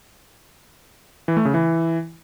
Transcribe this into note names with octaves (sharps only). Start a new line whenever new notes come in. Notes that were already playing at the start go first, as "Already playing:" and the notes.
E3
A3
C#3
E3